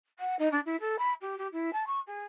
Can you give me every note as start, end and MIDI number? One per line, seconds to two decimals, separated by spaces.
0.19 0.35 78
0.39 0.48 63
0.51 0.60 62
0.65 0.76 64
0.80 0.96 69
0.98 1.13 83
1.21 1.37 67
1.38 1.47 67
1.52 1.70 64
1.72 1.83 81
1.86 2.00 85
2.06 2.23 68